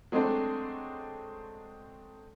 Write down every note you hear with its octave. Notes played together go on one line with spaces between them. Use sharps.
F#3 G#3 A3 C4 D4